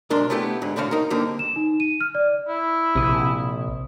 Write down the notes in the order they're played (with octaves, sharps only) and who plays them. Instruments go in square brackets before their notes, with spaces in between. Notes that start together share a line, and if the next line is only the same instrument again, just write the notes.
[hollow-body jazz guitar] B1 G#2 D4 A#4 C6
A3 B3 E4 G4
G#2 D3
A2 D3 C4 F#4 F5
D#4 A#4
G2 D3 A#3 C4
[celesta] E7
D#4
D#7
F6
D5
[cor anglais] E4
[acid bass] A#1 [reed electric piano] C3 D#6